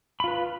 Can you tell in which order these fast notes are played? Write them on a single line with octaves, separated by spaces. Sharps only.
B5 F4 B4